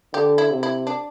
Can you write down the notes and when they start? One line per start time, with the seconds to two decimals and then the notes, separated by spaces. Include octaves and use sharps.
0.13 D3 G4
0.38 E4
0.51 C3
0.63 E4
0.87 D4